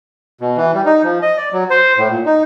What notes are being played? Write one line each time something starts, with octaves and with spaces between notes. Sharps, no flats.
B2
E3
G3
D#4
F3
D#5
D5
F#3
C5
A2
A#2
D#4